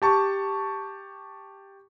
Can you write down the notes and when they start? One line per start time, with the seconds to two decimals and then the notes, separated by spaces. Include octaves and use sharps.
0.02 G4 A5 C#6